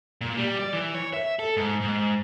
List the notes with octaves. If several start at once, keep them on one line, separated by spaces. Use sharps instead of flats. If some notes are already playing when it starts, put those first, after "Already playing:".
A#2
G3
D5
E3
C#5
E5
A4
G#2
G#2